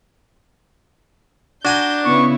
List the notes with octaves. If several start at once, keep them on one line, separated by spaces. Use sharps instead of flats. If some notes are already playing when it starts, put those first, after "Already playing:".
D4 F#4 G#5 A#5 G6
C#3 B3 E4 C#6